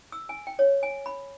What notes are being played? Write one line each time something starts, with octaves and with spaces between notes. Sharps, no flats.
E6
G#5
G5
C#5
G#5
B5